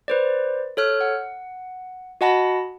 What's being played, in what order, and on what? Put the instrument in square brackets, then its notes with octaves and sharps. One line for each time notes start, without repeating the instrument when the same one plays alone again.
[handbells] B4 C5 D5
A4 C#5 F6 F#6
F#5
F#4 D#5 F#5 A5 B5 A#6